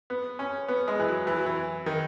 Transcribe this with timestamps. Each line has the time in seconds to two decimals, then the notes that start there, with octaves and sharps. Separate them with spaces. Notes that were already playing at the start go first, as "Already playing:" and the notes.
0.10 B3
0.39 C#4
0.68 B3
0.88 G#3
0.99 E3
1.08 F#3
1.27 E3
1.37 F#3
1.46 E3
1.86 D#3